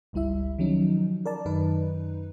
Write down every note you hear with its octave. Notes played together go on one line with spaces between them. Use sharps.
G1 C#2 G3 E4 E5
D#3 F3 F#3 C#4 D#4
A#4 D5 A5
F#2 D#3 D#4 B4